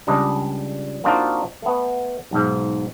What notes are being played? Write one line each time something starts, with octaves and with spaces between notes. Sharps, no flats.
C#2 G3 D4 D#5
A#3 C4 D4 D#4 F4 F#4
A3 B3
B1 G#2